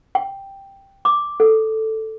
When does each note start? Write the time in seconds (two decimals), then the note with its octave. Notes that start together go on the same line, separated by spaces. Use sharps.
0.15 G5
1.05 D6
1.40 A4